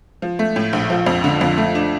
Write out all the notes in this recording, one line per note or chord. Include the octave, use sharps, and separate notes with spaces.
F3
A3
A2
A#1
F3
F2
D3
F2
A3
D4